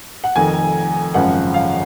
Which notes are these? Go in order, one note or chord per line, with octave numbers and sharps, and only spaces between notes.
F#5
F1 F2 D#3 G#5
G#1 F#2 C#3 F3 F#5
F5